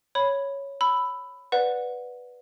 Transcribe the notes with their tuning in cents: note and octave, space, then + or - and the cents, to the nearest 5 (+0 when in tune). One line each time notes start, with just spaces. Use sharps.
C#5 +0 B5 +0
B5 +10 E6 +0
B4 +0 D5 +0 F#5 -15